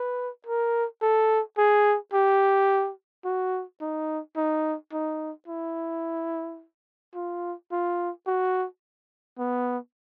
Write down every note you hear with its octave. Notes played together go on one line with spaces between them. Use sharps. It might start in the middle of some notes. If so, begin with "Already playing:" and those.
Already playing: B4
A#4
A4
G#4
G4
F#4
D#4
D#4
D#4
E4
F4
F4
F#4
B3